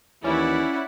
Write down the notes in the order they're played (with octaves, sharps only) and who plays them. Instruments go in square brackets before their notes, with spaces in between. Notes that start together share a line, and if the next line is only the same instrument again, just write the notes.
[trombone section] D#2 E3 [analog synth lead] C#4 [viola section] E4 [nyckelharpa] D5 F#5